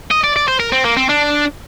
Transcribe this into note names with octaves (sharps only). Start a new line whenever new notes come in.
D#5
D5
D5
C5
A#4
C4
A#3
C4
D4